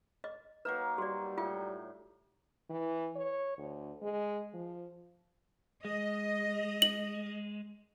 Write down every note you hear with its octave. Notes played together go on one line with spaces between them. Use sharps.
D#5
F#3 A#3 D#4 B4
G3 F#4 D5
A2 F4 G5
E3
C#5
D2
G#3
F3
G#3 D#5
F#7